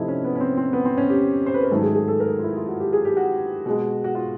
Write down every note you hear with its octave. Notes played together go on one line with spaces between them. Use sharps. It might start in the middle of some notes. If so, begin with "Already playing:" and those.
Already playing: C3 F3 A3 D#4 E4
C#4
B3
C#4
C4
C4
B3
C4
C#4
G4
C5
B4
A#4
G#2 D#3 F#3 A3 A4
G#4
G#4
A4
A#4
F4
E4
F4
F#4
G4
G#4
G4
F#4
B2 G#3
F#4
F4